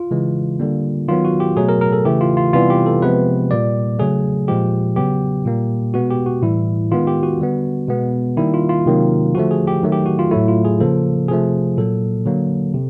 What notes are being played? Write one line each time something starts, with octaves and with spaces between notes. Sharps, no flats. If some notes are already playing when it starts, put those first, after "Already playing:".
Already playing: F4
C#3 E3 G#3
D3 G3 A#3
D#3 F#3 B3 F4
F#4
G4
B2 F#3 A3 G#4
A#4
A#4
A4
C#3 E3 A3 G4
F4
F4
C3 E3 G3 B3 F4
G4
A4
C3 F3 G#3 B3 B4
A#2 G3 A#3 D5
C#3 F#3 A3 G#4
A#2 F3 G#3 G4
C#3 F#3 B3 G4
A#2 G3 A#3
B2 G#3 B3 F#4
G4
F#4
A2 E3 G3 E4
D#3 G#3 B3 F4
G4
F#4
D3 G3 B3
B2 G#3 B3
D#3 G3 A#3 E4
F4
F4
C3 D#3 F#3 A#3
D3 F3 A3 F#4
G#4
G4
D#3 F#3 A3
G4
F#4
F4
A2 F#3 A3 E4
F4
G#4
C#3 F3 A#3 A4
C3 F3 A3 G#4
A#2 F#3 A#3 A4
D3 F#3 A#3
C3